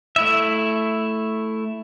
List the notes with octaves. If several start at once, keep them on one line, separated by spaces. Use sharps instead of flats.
A3 E4 E5